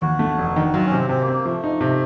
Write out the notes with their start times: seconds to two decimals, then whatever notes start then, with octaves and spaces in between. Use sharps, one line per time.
0.02 D#2 F#4
0.19 A3
0.38 F1
0.56 D#3
0.73 F#3 F4
0.85 C#4
0.92 C3
0.97 C4
1.09 C3 C4
1.21 A#3
1.28 C4
1.33 A#3
1.45 F3 A3
1.64 D#4
1.81 C3